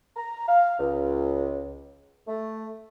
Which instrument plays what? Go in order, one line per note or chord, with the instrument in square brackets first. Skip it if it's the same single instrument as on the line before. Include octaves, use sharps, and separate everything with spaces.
[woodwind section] A#5
F5
C#2
A3